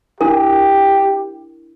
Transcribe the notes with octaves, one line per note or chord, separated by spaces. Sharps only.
D4 E4 G4 A#4